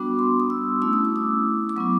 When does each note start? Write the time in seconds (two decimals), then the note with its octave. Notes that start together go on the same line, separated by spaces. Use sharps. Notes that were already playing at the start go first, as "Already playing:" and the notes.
Already playing: G3 B3 D4 F#4 D6
0.19 C6
0.40 D#6
0.50 E6
0.82 A3 C#4 E4 E6
0.93 D#6
1.05 D6
1.16 D#6
1.69 D6
1.76 F#3 B3 E4 C#6